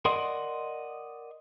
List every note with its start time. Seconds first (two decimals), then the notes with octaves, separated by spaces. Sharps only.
0.05 A#4 D5 D#5 F#5 C6